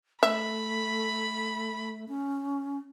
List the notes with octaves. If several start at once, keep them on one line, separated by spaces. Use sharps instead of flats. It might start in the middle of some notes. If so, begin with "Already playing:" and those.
A3 E5 B5
C#4